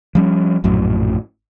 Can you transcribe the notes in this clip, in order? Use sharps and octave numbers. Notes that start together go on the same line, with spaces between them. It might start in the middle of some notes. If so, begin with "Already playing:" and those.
F3 G3 C#4
A#1 F#2 A2 F#3